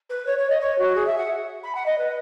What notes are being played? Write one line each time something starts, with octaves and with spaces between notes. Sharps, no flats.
B4
C#5
C#5
D#5
C#5
F#4
G#4
E5
F#5
B5
F#5
D#5
B4